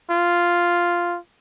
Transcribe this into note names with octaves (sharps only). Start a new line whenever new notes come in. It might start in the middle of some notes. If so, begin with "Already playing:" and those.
F4